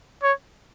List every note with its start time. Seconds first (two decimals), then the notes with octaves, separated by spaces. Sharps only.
0.23 C#5